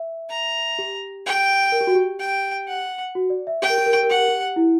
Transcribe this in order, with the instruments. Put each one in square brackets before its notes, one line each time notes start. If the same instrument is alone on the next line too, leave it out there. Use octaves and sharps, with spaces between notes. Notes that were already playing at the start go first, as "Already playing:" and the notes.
Already playing: [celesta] E5
[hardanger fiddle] A#5
[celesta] G4
[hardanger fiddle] G5
[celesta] A#4
G4
F#4
G4
[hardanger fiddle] G5
F#5
[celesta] F#4
D5
E5
[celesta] G4 [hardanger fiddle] G5
[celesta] A#4
G4
A#4
G4
A#4
[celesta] G4 [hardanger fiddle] F#5
[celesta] A#4
G4
E4